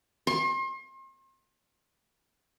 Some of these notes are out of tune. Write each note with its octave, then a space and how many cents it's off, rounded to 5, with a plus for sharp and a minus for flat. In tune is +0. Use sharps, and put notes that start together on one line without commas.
C6 +40